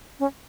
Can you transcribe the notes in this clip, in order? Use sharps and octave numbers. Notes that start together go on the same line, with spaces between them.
C#4